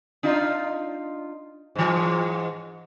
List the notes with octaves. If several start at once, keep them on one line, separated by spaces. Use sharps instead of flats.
D4 D#4 F4
G#2 E3